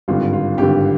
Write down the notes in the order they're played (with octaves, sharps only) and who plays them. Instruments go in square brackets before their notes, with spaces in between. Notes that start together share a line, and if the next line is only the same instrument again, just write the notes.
[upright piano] G#1 G2 D3 F4
F4
G#1 G2 D3 G4